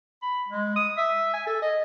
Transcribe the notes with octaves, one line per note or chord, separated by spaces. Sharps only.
B5
G#3
D#6
E5
G#5
A4
D#5